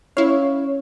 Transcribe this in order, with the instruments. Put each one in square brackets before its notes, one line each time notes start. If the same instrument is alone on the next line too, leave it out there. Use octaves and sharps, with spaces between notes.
[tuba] C#4 [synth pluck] E4 F5 [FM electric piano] C#5